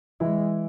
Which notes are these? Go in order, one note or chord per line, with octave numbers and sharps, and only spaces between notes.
E3 G#3 E4